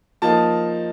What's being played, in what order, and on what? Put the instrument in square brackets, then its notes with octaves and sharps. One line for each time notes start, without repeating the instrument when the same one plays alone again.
[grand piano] F3 A#3 D#4 A5